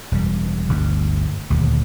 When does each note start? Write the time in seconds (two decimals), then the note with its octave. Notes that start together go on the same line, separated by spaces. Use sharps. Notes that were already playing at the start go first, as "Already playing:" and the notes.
0.12 E1 G3
0.69 G1 D2 G2
1.50 D#1 D2